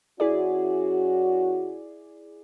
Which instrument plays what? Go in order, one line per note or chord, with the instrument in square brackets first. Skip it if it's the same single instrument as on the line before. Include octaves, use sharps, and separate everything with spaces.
[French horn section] F#2 C#4 F#4 [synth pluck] E4 G#4 D5